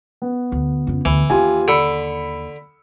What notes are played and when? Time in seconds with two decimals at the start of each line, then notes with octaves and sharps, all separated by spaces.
0.22 B3
0.52 D2
0.87 F2 C#3
1.05 D2 E3
1.30 D#2 F4 G4 G#5
1.68 D3 B5 E6 C#7